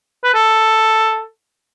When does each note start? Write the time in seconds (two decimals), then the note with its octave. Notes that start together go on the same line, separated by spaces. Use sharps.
0.24 B4
0.34 A4